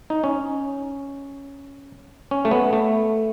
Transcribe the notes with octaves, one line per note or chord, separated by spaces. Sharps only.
D#4
C#4
C#4
A3
B3
A3